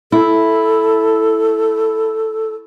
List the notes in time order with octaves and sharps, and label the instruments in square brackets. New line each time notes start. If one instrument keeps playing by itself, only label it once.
[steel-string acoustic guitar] E4 [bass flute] A4